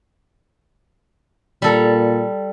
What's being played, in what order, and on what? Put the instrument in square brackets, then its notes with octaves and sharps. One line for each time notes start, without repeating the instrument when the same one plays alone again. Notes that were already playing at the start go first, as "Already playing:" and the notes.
[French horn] A#2 [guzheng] G3 A4 A#5